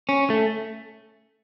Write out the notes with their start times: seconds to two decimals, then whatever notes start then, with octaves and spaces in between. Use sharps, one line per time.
0.09 C#4
0.30 A3